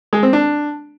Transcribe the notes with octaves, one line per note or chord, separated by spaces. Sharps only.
G#3
C4
D4